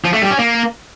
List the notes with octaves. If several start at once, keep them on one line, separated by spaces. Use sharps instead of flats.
F3
A3
G3
C#4
A#3